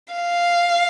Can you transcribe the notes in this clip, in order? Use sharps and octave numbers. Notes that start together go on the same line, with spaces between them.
F5